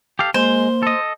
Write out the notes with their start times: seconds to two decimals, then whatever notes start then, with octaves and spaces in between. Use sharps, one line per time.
0.19 G4 A4 F5
0.34 G#3 A#3 C5
0.83 A4 D#5